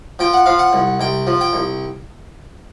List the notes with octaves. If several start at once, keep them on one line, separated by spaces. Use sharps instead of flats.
F3 G5
F#5
F3 F5
F#5
C2
C2 G5
F3
G5
C2